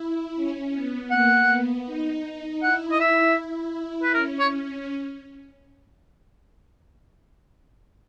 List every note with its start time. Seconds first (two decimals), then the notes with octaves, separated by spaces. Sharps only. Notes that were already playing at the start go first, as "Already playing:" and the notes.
Already playing: E4
0.35 C#4
0.73 B3
1.11 A#3 F#5
1.49 B3
1.86 D#4
2.62 E4 F#5
2.92 D#5
3.01 E5
3.39 E4
4.03 B4
4.14 C#4 A#4
4.39 C#5